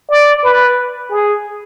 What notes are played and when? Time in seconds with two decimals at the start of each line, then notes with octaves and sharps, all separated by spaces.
0.10 D5
0.44 B4
1.11 G#4